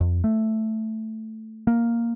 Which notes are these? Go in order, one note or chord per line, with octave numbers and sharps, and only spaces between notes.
F2
A3
A#3